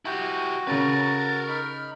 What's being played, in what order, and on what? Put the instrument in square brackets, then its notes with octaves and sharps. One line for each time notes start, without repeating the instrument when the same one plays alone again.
[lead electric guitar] E4 G4 [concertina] F#4 [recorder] D#5
[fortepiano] C#3 C#4 [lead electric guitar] A#4 B4 [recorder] A6
[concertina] D#4 B5 [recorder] F6